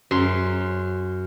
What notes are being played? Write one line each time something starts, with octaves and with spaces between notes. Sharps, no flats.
F#2 C6